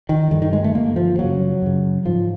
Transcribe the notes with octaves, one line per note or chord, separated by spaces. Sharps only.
D#3
G2 D3 D#3
D#3
G#3
A3
G2 D3 A#3
F3
F#2 C#3 F#3
F#2 C#3
G#2 F3